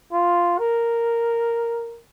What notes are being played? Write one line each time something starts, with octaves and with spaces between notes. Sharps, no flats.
F4
A#4